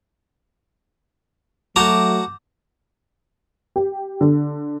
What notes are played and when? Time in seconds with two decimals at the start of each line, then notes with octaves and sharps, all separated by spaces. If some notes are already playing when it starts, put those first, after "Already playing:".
1.76 F#3 A3 F#4 A5 A#5 D6 G6
3.76 G4
4.21 D3